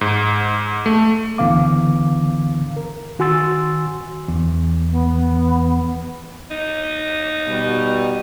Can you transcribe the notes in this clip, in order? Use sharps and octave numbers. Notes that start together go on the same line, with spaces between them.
G#2
A3
C#2 D3 E3 B3 F5 D6
A#4
D#3 F#4 G#5 C6 E6 A6
E2
B3
D#4
B2 G3